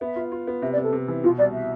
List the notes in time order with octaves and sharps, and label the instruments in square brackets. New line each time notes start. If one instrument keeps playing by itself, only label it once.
[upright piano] B3 [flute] E5
[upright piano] F4
F4
B3
[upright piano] C3 [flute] E5
[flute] D5
[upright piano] C3
[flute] A4
[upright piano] C3
E3
[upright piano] B2 [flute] F4
[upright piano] C2 [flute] D5
[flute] E5